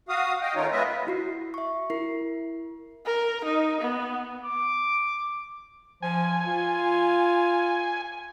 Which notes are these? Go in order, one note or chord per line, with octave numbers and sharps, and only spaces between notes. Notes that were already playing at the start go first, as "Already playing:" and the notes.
F#4 F5 D#6
D#5 F5 G5
D#3 A3 C#4 D#4 F4 C#5
G#3 B3 F4 B4 D#5 E5
E4 F#4 C7
E5 C#6
E4 A#4 C7
A#4
D#4
B3
D6
F3 G#5
F4